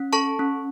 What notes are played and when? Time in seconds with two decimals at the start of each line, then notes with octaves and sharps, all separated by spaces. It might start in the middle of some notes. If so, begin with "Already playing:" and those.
Already playing: C#4
0.13 A4 A5 C#6
0.39 C#4